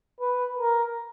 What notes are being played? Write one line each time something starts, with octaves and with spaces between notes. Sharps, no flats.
B4
A#4